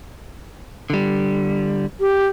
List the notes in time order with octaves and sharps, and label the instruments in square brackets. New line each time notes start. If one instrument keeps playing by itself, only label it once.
[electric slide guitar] D3 G3
[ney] G4